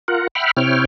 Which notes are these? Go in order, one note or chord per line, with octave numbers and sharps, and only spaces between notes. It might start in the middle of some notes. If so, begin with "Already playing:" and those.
F4 A#4 F#5
E5 F#5 G5 B5 F6
C3 C4 E4 C#5 G5 F6